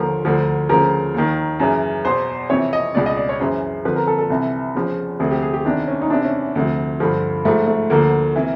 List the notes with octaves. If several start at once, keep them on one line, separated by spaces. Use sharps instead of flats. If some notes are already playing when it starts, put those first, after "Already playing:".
Already playing: D#2 D3 F3 A#4
D2 D3 F3
D2 C#3 F3 A#4
D#2 D#3
F#2 C#3 E3
E2 B2 C5
F2 C3 E3 C#5
D#5
C#2 B2 D5
D#5
D5
C#5
F#2 C#3 E3 C5
F2 D3 F3 B4
A#4
A4
A4
C2 C3 E3
E2 C#3 F3
D2 C3 F3 G#4
G4
G#4
G4
E2 C3 D#3 D4
C#4
D#4
E2 C3 E3 D4
C#4
D2 C3 F3
G2 D3 F3
G#2 F3 A3
A3
D2 D3 F3 A#3
C3 E3